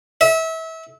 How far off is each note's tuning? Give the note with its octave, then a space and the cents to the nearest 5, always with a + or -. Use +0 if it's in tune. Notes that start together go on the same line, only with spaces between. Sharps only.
E5 -30